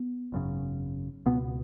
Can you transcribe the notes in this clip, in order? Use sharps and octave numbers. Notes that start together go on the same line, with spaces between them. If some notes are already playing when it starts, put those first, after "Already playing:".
Already playing: B3
G#1 F#2 C#3
C#2 B2 B3